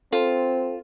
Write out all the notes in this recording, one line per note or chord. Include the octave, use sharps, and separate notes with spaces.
C4 F4 A4